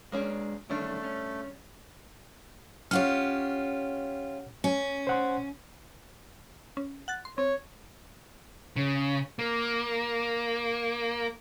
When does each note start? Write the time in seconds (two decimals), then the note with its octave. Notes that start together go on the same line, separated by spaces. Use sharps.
0.12 G#3 A#3 C#4 D4 G#4
0.70 D3 D#3 G3 A3 C#4 D4
1.03 C#4
2.91 C#4 F4 G4 C#5 F#5 F6
4.64 C#4
5.07 C5 F#5 C6
6.77 C#4
7.08 F#5 F#6 A6
7.25 C6
7.38 C4 C#5
8.76 C#3
9.39 A#3